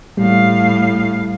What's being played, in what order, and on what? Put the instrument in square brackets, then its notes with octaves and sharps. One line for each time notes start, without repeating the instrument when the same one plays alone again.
[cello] A2 F5 [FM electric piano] G3